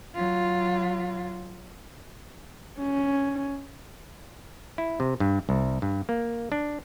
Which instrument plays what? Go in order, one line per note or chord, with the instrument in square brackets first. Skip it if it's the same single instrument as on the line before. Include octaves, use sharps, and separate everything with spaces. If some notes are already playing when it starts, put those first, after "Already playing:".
[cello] F#3 F4
[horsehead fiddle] C#4
[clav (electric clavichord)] E4
C3
G2
C2
G2
A#3
D4